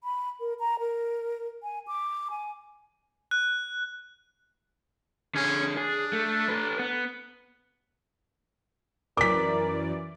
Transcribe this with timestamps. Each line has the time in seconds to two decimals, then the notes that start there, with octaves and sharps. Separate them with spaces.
0.04 B5
0.40 A#4
0.60 A#5
0.79 A#4
1.63 G#5
1.87 D6
2.31 G#5
3.31 F#6
5.35 D3 C#4 G#4
5.77 D4 G#4
6.13 A3
6.49 A4 B4
6.79 B3
9.17 F#2 E3 A#4 D5 D6 B6